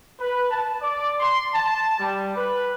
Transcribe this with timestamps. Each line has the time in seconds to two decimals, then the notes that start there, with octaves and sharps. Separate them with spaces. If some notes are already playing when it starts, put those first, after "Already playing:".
0.19 B4
0.50 A5
0.81 D5
1.18 C6
1.52 A5
1.99 G3
2.36 B4